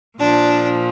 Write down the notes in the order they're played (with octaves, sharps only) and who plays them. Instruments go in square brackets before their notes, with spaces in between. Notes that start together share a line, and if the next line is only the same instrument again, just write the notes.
[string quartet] A#2 F3 D4